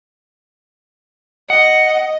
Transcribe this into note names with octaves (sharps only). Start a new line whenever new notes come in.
D#5 F#5